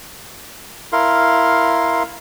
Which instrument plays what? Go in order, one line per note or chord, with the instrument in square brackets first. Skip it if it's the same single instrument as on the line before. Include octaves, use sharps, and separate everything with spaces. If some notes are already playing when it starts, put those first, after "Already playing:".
[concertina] E4 A#4 F5 C6